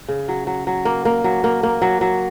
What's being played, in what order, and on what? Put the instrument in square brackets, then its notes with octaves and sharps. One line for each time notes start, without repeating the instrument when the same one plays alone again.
[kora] C#3
F#3
F#3
F#3
A#3
A#3
F#3
A#3
A#3
F#3
F#3